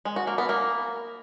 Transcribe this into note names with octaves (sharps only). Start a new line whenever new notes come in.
G#3
F#4
A#3
B3
A#3